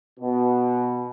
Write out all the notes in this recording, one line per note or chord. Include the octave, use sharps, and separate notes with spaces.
B2